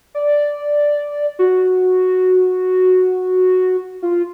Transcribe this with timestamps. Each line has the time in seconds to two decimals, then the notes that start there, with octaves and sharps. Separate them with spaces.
0.15 D5
1.39 F#4
4.02 F4